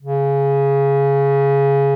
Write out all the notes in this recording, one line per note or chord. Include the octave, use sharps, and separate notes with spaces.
C#3